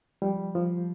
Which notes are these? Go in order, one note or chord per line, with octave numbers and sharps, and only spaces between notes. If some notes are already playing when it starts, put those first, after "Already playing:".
F3 G3
F3